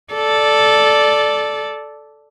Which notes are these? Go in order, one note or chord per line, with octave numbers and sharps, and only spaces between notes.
A4 D5